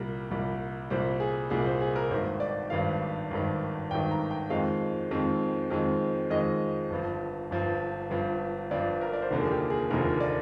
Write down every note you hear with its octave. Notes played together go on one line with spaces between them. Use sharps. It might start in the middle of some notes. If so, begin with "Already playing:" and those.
Already playing: C2 A#2 G3 A#4
C2 A#2 G3
C2 A#2 G3 C5
G#4
C2 A#2 G3 G#4
C5
G#4
A#4
G#1 G2 D#3 C5
D5
G#1 G2 D#3 F5
G#1 G2 D#3
G#1 G2 D#3 G5
A#5
G5
F2 D#3 G#3 C4 F5
F2 D#3 G#3 C4
F2 D#3 G#3 C4
F2 D#3 G#3 C4 D#5
G1 G2 F3
G1 G2 F3
G1 G2 F3
G1 G2 F3 D5
A#4
D5
C5
F1 D#2 D3 F3 A#3 A#4
G#4
G4
G#4
F1 D#2 D3 F3 A#3 A#4
D5